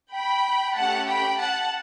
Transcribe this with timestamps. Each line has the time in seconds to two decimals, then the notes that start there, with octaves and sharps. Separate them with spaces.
0.13 G5 B5
0.76 A3 C#4 G4 F#5 A5
1.08 G5 B5
1.39 F#5 A5